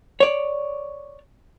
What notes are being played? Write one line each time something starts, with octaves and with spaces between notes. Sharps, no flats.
C#5 D5